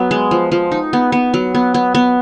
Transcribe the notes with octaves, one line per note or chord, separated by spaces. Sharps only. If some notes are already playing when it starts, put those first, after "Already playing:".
Already playing: F#3 B3
G#3
F3
F3
D#4
B3
B3
F#3
B3
B3
B3